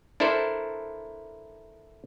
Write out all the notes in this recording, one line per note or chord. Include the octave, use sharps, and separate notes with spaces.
D4 E4 A4 A#4 C5